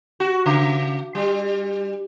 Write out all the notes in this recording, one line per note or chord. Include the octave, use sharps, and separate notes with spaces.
F#4
C#3
G3